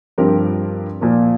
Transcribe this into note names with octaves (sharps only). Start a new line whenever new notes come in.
G2 F3 C4 G4 A#4
A#2 F3 A#3